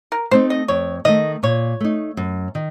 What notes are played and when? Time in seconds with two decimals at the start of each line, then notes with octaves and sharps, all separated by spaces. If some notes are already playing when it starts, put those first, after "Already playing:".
0.12 A#4
0.31 A3 C4 D#4 C5
0.50 D#5
0.68 F2 C#5
1.05 D#3 A3 D#5
1.43 A#2 C#5
1.80 A3 D#4
2.17 F#2
2.55 D#3